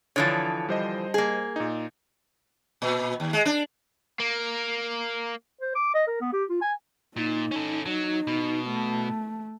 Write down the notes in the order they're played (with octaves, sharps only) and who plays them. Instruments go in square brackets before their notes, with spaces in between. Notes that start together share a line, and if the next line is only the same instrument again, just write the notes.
[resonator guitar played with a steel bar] D3 E3 F3 [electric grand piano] C#5 D#6 A6
[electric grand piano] G3 C5 D#5
[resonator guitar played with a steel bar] A#3 G#4
[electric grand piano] A#2 D#4
[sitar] A#2
D#2
G#3
D4
[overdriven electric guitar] A#3
[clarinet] C5
D6
D#5
A#4
B3
G4
F4
G#5
[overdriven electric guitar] A#2 [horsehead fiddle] D#4
[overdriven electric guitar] C#4 A4
[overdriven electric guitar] F#3 [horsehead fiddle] D#4
[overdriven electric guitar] B2
[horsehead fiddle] A3